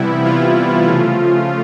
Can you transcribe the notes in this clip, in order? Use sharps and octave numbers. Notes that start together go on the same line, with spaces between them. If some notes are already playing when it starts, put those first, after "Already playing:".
Already playing: C3 E3 G3 B3 E4
F4
C#3 F3 A3